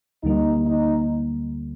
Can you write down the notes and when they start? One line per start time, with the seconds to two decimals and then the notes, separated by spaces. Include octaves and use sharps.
0.23 D2 D3 G3 A#3 D#4
0.66 D#4